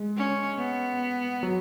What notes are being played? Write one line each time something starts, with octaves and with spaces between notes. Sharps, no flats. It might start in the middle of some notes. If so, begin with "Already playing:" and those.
Already playing: G#3
C#4
B3
F#3